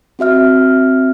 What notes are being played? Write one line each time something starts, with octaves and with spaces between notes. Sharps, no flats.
C4 F#4 E5 F6